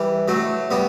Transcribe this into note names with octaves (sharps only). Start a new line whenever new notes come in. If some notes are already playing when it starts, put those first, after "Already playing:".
Already playing: E3 G3
F#3 A3
G3 B3